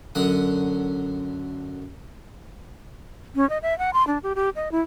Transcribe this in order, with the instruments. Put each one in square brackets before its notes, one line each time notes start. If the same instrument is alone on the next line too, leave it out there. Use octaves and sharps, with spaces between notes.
[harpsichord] F#2 D3 F#5 D#6
[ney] C#4
D#5
E5
F#5
C6
D4
G4
G4
D#5
E4